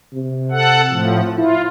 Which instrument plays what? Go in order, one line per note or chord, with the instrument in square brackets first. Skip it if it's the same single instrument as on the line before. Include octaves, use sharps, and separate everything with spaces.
[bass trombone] C3
[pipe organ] A4 F#5
A2 F3
[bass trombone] E4 [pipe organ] F4